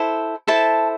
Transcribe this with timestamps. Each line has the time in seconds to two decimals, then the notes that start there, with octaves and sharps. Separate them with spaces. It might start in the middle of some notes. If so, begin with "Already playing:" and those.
Already playing: E4 A4 C5
0.47 E4 A4 C5 A5